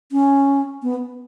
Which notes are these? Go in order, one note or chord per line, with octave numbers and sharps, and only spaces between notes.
C#4
B3